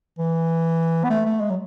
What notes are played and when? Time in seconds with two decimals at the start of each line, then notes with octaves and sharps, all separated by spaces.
0.19 E3
1.04 B3
1.10 A3
1.25 A3
1.40 G#3
1.50 F#3